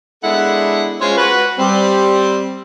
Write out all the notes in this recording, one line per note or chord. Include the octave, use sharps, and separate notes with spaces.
G#3 B3 D4 E4 A4 F#5
G#3 C#4 F4 C5 C#5
F#4 B4
G3 C4